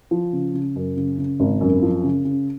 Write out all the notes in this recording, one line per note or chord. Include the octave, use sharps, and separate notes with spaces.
F3
C#3
C#3
F#2
C#3
C#3
G#1
F#2
F3
C#3
C#3